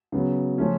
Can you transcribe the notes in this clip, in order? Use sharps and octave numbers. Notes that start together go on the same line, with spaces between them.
C#3 F#3 B3
C#3 F3 A3 C#4